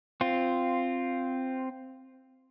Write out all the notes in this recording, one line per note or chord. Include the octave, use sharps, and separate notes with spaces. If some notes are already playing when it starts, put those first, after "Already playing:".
C4 F4